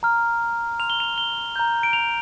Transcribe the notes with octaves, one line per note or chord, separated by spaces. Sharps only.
A#5 F6
C6 F6 F7
G7
F7
G7
A#5 G6
D7
F7